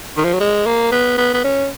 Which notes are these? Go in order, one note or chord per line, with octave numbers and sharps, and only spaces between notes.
D#3
F3
F#3
G#3
A#3
B3
B3
B3
C#4